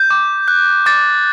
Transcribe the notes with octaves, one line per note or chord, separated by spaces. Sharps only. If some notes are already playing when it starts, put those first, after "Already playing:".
Already playing: G6
D6
F#6
D6 A6